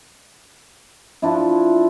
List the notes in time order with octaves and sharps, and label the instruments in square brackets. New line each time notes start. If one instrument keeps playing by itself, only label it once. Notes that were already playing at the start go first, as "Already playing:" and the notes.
[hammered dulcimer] F3 D4 E4